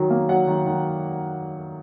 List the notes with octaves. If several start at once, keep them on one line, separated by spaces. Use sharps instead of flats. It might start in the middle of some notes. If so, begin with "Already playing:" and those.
Already playing: D#3 F#3
A#3
F#3 F#5
D#3
D#3